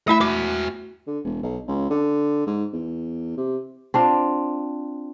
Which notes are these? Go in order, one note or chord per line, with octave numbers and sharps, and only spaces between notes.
A3 E4 D#5 E5 B5
F#4 E5 D6
D3
E1
B1
C#2
D3
G#2
E2
C3
C4 D4 F4